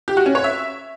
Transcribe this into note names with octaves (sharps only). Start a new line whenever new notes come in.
G4
F#4
C#4
C#5
E5